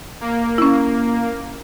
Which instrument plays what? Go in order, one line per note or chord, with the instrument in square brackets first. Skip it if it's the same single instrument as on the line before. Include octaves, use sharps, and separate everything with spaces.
[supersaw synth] A#3
[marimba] C#4 E4